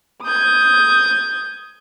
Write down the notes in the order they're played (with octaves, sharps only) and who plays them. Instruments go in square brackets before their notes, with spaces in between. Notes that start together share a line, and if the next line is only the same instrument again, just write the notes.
[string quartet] D#6 G6 G#6